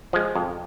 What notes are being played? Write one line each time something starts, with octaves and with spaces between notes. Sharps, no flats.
F3 G#3
F2